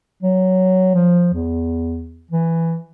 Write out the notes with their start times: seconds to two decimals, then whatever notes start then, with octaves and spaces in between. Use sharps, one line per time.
0.22 F#3
0.95 F3
1.34 E2
2.31 E3